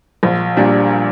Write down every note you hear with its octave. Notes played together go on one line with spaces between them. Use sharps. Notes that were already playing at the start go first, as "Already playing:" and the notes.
A#1
A#2 G3 D4